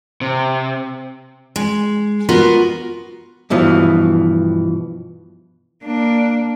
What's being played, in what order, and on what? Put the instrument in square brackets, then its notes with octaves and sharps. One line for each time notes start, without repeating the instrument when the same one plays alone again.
[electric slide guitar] C3
[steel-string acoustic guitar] G#3
B3 F4 F#4 A#4
[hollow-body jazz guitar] G2 B2 E3 F3
[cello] A#3 D4